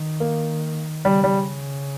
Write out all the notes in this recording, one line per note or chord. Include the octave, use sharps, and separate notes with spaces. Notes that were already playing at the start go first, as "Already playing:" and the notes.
Already playing: D#3
A#3
C#3 G3
G3